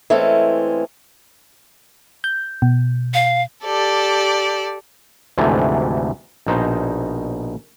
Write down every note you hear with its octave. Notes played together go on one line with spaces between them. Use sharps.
E3 G#3 A3 C4 C#4
G6
B2
F5
G4 A4 D5
D2 G#2 C3 E3 F3 A3
A#1 B2 D#4 C5 A#5